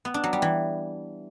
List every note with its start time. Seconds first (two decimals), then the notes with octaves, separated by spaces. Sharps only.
0.05 B3
0.14 D4
0.24 F#3
0.33 G3
0.42 E3